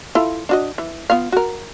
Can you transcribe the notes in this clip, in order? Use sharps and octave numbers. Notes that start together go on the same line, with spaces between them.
E4 F4 A4
D4 F#4 D#5
E3
B3 F4 F5
F#4 A#4